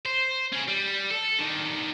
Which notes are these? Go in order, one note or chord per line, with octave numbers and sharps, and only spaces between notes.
C5
C#4 G#4
G3
A4
D3 D#3